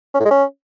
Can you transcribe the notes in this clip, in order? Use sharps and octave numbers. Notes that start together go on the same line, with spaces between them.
C#4
A2
G#3
C#4